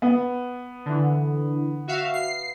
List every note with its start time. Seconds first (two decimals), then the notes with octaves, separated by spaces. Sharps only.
0.02 B3
0.86 D3 E3
1.87 F#4 E5 F5
2.14 C7